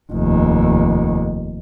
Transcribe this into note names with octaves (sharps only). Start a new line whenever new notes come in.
F1 D#2